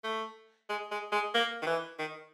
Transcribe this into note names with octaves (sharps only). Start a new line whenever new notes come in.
A3
G#3
G#3
G#3
A#3
D#3
E3
D#3